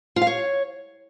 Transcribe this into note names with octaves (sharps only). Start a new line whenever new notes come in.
F4
F5
C#5